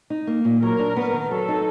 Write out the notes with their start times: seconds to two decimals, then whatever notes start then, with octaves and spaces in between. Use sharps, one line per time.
0.10 D#4
0.27 A#3
0.45 A#2
0.62 F#3 A#4
0.79 D4
0.96 B3
1.13 D#3
1.31 F#3 A4
1.48 D#4